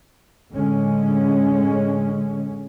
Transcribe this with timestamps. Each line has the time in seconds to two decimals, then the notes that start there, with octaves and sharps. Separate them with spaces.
0.53 A2 D3 G#3 C#4